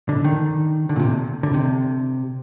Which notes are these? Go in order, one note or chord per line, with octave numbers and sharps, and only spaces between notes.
D3
D#3
D3
A#2
C3
D3
C3